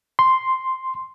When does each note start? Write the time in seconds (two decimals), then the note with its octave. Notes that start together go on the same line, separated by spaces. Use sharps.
0.19 C6